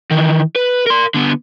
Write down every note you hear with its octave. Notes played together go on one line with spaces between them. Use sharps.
D#3 E3
B4
A#4 C6
D3 B3